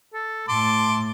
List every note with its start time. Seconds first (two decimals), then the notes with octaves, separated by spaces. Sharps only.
0.14 A4
0.49 A2 A5 C6 D6